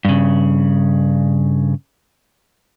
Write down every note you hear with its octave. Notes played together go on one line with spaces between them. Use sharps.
G2 C#3